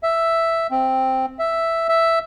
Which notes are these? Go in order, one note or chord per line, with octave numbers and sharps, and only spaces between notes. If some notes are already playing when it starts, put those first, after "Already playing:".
E5
C4
E5
E5